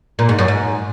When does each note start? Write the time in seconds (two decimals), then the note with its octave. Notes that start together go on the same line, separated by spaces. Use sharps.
0.19 A#2
0.29 G#2
0.39 F#2
0.48 G#2